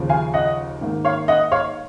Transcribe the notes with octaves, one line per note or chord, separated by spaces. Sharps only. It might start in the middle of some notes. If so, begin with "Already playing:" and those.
Already playing: D#2 C#3 F3
F5 G#5
D#5 F#5
G#2 D#3 A#3
C#5 F5
D#5 F#5
C#5 F5